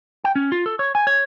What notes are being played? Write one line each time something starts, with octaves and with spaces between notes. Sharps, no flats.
G5
C#4
F4
A4
C#5
G#5
C#5